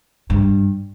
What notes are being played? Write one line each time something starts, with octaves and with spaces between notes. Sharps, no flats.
G2